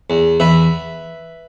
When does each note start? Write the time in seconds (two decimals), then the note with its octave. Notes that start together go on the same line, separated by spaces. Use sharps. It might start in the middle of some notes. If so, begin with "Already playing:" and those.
0.10 E2
0.40 E2 B4 E5